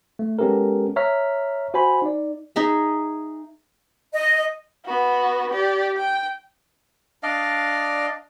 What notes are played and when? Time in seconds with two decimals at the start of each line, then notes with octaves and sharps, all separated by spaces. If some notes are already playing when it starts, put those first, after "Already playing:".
0.19 A3
0.39 G#3 B3 C#4 G4 A4 A#4
0.96 C#5 E5 A#5 F6 B6
1.74 F#4 C5 G#5 B5
2.02 D#4 D5
2.56 D#4 G#4 E5
4.13 D#5
4.86 B3 F#4
5.52 G4 D5
5.97 G5
7.23 D4 D5 D#5 F5